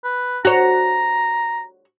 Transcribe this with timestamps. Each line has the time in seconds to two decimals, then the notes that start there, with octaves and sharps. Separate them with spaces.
0.04 B4
0.45 F#4 C#5 A#5